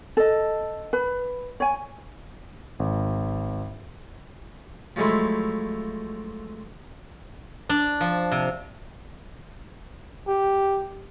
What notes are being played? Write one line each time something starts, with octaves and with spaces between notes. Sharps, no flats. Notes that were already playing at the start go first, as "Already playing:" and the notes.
A4 D#5
B4 B5
C#5 G#5
G#1
F3 F#3 G#3 A3 E4 F4
D4
F3
C3
G4